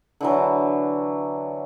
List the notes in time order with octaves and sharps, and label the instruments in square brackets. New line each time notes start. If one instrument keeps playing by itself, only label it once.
[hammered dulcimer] D3 E3 F#3